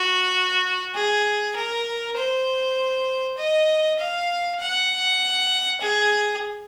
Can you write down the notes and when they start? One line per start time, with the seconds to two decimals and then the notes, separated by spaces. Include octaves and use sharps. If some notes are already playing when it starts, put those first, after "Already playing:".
Already playing: F#4
0.95 G#4
1.56 A#4
2.17 C5
3.38 D#5
3.99 F5
4.60 F#5
5.81 G#4